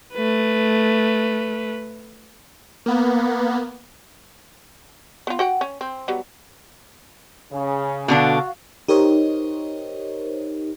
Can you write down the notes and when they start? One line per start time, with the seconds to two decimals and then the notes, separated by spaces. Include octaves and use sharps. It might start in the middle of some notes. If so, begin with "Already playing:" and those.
0.14 A3 B4
2.86 A#3 B3
5.27 B3 F4
5.39 F#4 F#5 G5
5.61 C#4
5.81 C4
6.08 F#3 G3 B3
7.52 C#3
8.08 B2 D3 D4 F#4 F5
8.88 D#4 G4 A#4 C5 C#5 D#5